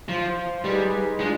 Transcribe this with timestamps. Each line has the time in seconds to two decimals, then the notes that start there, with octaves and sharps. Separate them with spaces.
0.09 F3 C5 F5 C6
0.64 G3 D#4 G#4 B4 D#5
1.20 G#3 D4 F4